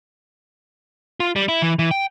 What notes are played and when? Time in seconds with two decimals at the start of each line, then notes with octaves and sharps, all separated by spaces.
1.20 F4
1.36 G3
1.48 E4
1.62 E3
1.79 E3
1.91 G5